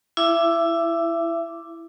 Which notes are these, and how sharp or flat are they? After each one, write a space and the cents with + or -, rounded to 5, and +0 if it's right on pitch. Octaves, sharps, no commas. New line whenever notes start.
E4 +10 E5 +30 D6 +0